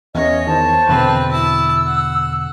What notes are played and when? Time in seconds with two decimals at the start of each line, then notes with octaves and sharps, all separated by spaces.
0.15 E2 C#4 C#5 D#5
0.47 E2 D#3 C5 A5
0.88 E2 B2 D3 C4 B4
1.31 E4 A5 E6
1.85 F#5